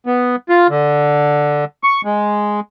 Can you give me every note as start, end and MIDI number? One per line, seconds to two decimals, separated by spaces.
0.06 0.36 59
0.49 0.67 65
0.69 1.64 50
1.84 2.01 85
2.05 2.60 56